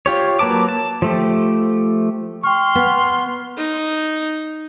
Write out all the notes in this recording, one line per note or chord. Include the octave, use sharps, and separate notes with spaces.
F4 G4 C#5
F#3 A#3 B4 A5 D6
A5
F3 A3 G4
G5 C6 C#6 F6
B3
D#4